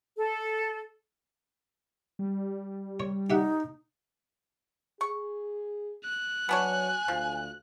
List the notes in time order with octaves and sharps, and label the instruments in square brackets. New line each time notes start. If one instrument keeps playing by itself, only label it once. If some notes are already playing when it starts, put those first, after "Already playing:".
[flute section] A4
[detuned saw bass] G3
[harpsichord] C#5
[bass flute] D#4 [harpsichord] G4 E5 F#5
[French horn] G#4 [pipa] C#6
[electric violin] F#6
[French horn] F#3 [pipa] B3 D4 C#5 [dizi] G#5
[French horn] D2 [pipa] F3